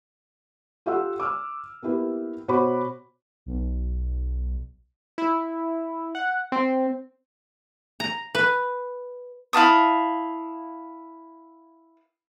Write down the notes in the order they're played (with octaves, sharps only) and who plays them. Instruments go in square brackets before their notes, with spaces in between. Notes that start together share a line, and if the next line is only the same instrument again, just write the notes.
[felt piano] F4 G4 A4 F5 F#5 E6
D6 E6 F6
A#3 B3 E4 G4 B4
B2 F#4 C5 C#5 B5 D6
[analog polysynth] B1
[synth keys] E4
F#5
C4
[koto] A#5
B4
[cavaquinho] E4 F5 A5 D#6